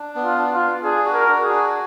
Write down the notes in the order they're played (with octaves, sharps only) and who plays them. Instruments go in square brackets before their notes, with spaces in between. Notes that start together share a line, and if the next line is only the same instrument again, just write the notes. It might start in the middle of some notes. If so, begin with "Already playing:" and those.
Already playing: [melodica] D4
B3
[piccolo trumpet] F4
[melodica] D4
[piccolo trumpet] F4
[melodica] D4
[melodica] D4 [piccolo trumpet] G#4
[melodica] F#4
[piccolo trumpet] A#4
[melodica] D4
[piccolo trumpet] G#4
[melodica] F#4